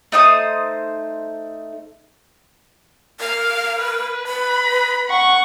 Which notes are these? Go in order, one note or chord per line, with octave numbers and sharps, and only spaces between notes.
A3 D#4 C5 D#6
A#4 F5
B4
B4 B5
F#5 C#6